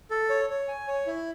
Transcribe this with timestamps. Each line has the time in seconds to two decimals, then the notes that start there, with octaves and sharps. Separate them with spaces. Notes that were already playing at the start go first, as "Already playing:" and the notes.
0.11 A4
0.30 C#5
0.50 C#5
0.68 G#5
0.88 C#5
1.07 E4